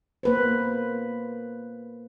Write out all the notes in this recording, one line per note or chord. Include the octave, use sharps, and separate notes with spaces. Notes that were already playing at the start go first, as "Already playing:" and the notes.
A#3 B4 C5